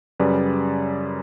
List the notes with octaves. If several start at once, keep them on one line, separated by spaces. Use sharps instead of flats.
F#2 C#3 G3 B4 D5